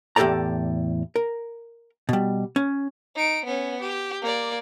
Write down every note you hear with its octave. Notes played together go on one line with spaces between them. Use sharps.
E2 A2 G4 A4 D5 A#5
A#4
B2 G3
C#4
D#4 D7
B3 C#4
G4
A#3 D5